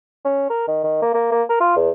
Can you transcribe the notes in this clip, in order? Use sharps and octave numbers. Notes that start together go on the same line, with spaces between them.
C#4
A#4
D#3
D#3
A#3
A#3
A#3
A#4
F4
E2